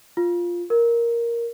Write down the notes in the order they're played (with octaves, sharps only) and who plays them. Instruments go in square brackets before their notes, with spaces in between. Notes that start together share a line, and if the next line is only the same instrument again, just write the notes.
[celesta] F4
A#4